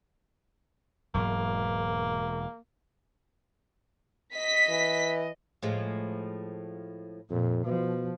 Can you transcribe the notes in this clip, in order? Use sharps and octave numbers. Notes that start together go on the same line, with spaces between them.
E1 G#2 B2 F#3 A#3
D#5 B6
E3
A2 F3 G#3
F2 A#2
B2 F3